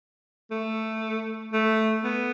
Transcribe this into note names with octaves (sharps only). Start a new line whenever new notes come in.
A3
A3
B3